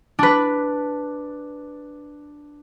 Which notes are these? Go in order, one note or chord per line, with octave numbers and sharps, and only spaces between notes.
D4 B4